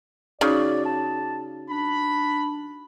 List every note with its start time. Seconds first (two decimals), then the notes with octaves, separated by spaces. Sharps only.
0.41 C#3 D#4 F#4 D5
0.85 A5
1.69 D4 B5